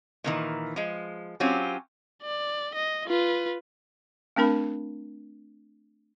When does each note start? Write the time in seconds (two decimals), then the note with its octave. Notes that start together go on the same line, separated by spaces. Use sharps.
0.24 A#2 D#3 E3
0.76 F3 G#3
1.40 F#3 C4 C#4 F4 G4
2.23 D5
2.74 D#5
3.06 F4 B4
4.36 A3 C4 D4 A#4 B5